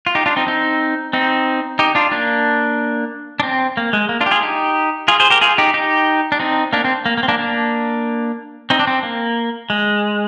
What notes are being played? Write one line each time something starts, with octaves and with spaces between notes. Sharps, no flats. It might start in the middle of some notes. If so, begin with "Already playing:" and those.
F4
D#4 G4
D4 F4
C4 D#4
C4 D#4
C4 D#4
D#4 G4
D4 F4
A#3 D4
D4
C4
A#3
G#3
A#3
D4 F4
G4
F4 G#4
D#4 G4
F4 G#4
G#4 C5
G4 A#4
F4 G#4
D#4 G4
D#4 G4
D4
C4 D#4
A#3 D4
C4
A#3
A#3
C4
A#3 D4
A#3 D4
C4 D#4
D4
C4
A#3
G#3